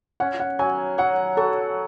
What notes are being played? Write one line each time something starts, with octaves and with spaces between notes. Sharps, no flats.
C#4 F#5
F#5
F#3 G#5
F#3 F#5
F#3 A4